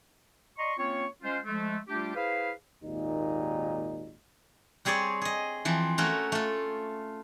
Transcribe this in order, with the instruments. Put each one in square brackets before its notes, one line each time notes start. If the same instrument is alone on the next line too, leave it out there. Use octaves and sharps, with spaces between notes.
[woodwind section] D5 D#5 A#5 C6 C#6
A#3 C4 C#4 F4 C#5
G#3 C#4 F4 C5
F3 G#3 A3
G3 A3 D4 F4 G4
E4 G#4 B4 C5 F5
[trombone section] G#1 D#2 A#2 D#4
[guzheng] G3 C4 G#4 C#5 D5
G#4 D#5
E3 F3 C4
A3 C#4 F#4 A#4
A3 F4